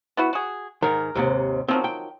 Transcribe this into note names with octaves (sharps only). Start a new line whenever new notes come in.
B3 E4 F#4
F#4 G#4
G#2 D#3 A#4
D#2 G#2 C3
D#3 F3 F#3 C4
G5